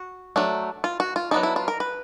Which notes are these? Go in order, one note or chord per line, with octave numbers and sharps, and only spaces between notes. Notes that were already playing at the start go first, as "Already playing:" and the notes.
Already playing: F#4
F#3 A3 D4
F4
F#4
F4
F#3 B3 D4 D#4
E4
F4
A#4
B4